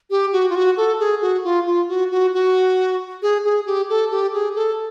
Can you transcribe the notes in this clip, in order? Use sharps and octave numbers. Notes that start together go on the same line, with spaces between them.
G4
F#4
F4
F#4
A4
G#4
F#4
F4
F4
F#4
F#4
F#4
G#4
G#4
G4
A4
G4
G#4
A4